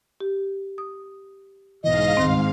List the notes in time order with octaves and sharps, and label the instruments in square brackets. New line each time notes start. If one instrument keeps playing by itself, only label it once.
[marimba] G4
D#6
[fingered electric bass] B1 B2 E3 [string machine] G#2 F5 [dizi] D#5
[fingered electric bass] C#2 G2 [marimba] D#3 C4